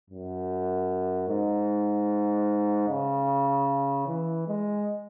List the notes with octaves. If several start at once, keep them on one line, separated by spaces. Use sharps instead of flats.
F#2
G#2
C#3
E3
G#3